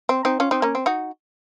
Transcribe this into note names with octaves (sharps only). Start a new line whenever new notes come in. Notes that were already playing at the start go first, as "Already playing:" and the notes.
C4
C4 D#4
C#4 F4
C4 D#4
A#3 C#4
C4
D#4 F#4